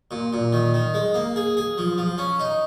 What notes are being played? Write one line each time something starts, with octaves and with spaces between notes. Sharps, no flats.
A#2
A#2
D#3
D#3
G#3
A#3
G#4
G#4
F3
F3
C#4
D#4